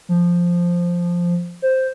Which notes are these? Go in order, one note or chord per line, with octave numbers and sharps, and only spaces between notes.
F3
C5